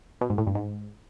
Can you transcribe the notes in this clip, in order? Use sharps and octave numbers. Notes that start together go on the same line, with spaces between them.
B2
G#2
A2
G2
G#2